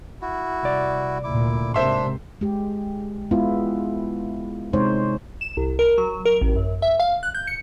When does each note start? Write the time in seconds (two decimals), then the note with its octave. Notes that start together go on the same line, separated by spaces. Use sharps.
0.22 E4 F#4
0.63 C2 D5
1.24 D2 A#2 E4 D6
1.74 G#2 C3 A#3 D4 C5 E5 C6
2.41 G#3 G4
3.31 G#3 B3 E4 F4
4.73 C3 G#3 D#4 C5 C#5
5.41 E7
5.57 C2
5.79 A#4
5.98 F#3
6.25 A#4
6.41 A1
6.56 F#2
6.82 E5
7.00 F5
7.23 F#6
7.34 G6
7.47 C#7